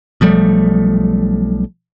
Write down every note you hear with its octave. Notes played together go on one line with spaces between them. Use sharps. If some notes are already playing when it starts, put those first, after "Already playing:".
B1 F3 G3 A3